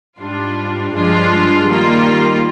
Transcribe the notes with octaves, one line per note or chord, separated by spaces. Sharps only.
G#2 G3 D4 F4
G2 F3 G#3 D4 F4
D#3 G3 A#3 F4